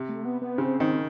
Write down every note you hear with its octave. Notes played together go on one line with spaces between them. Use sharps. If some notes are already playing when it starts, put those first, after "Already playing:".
Already playing: C3
A3
B3
B3
C#3 C4
D#3 C4